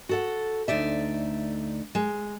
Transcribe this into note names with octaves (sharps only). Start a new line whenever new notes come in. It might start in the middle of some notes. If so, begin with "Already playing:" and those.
F#4 A4 F#5
D2 D#4 D5 E5
G#3